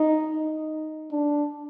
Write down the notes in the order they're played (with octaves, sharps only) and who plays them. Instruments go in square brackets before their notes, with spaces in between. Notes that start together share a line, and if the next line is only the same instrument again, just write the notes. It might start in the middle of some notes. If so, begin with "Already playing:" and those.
Already playing: [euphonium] D#4
D4